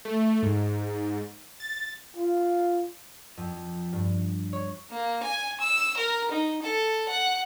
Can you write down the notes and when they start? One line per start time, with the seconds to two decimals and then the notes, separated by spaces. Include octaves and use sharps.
0.05 A3
0.43 G#2
1.60 A6
2.17 F4
3.37 F2
3.93 G2
4.53 C#5
4.91 A#3
5.23 G#5
5.60 E6
5.97 A#4
6.31 D#4
6.63 A4
7.09 F#5